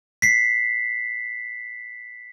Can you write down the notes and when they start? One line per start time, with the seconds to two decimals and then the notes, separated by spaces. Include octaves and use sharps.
0.22 B6 C7